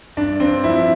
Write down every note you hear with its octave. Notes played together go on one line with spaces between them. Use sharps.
G2 D4
G2 C4
F3 E4